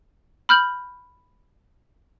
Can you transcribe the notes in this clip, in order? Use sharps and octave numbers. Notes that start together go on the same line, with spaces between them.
B5 F6 G6 F#7